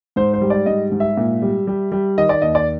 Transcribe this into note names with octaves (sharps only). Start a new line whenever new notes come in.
G#2 C5
C5
G3
D5
G#2 D#5
G#2
E5
A#2
G3
G3
G3
D#3 D#5
D5
D#2 D#5
D5